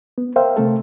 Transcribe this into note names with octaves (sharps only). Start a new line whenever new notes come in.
B3
A#4 C5 E5 F5 G5
C3 A3 A4